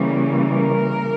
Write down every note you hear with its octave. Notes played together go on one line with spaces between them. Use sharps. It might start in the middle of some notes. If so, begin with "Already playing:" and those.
Already playing: C#3 E3 G3 A#3
A#4